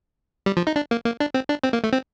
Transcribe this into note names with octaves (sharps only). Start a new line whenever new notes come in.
G3
F3
D#4
D4
A#3
A#3
D4
C4
D4
C4
A#3
A3
C4